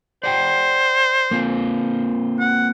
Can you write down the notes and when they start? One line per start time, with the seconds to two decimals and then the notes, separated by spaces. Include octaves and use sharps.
0.24 C5 D5 F#5 G5
1.31 A#3 C4 F4
2.39 F#5